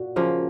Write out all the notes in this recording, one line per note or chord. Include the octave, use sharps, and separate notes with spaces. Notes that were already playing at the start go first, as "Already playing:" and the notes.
Already playing: A#2 F#4
C#3 F3 A#3